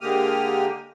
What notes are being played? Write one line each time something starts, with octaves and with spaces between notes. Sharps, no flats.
D3 G#3 A#3 G4 D#6 F6